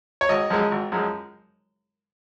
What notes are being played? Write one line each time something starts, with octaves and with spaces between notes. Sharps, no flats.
C#5
G#1 D#5
F#2 F3 G#3
G#1
F#2 F3 G#3